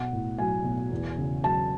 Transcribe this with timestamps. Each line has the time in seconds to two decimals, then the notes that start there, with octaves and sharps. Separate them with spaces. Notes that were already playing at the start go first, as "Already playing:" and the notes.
Already playing: B1 F#5
0.13 A2
0.38 F#3 G#5
0.64 B1
0.92 E2
1.18 C#3
1.43 F#3 A5